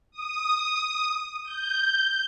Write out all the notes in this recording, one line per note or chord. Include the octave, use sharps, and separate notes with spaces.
D#6
G6